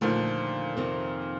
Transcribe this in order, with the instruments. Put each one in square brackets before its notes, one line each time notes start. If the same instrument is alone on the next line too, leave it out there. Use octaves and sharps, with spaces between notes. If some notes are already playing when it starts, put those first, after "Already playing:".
[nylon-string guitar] D#2 D3 F3 A3 [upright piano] A#2
[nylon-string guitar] F2 C3 D#3